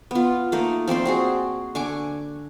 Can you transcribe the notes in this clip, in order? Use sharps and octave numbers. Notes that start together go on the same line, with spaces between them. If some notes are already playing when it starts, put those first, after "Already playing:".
B3 F4
A3 A#3 D#4
F3 C4 D5 C6
C4 F#4 G#4
D3 G#5 C#6 D6